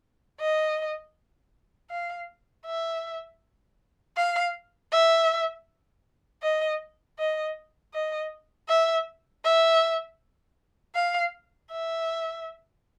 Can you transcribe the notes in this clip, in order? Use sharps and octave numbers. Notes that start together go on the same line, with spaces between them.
D#5
F5
E5
F5
E5
D#5
D#5
D#5
E5
E5
F5
E5